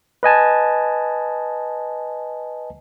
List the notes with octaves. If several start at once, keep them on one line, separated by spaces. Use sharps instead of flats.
B4 D#5 G#5 A5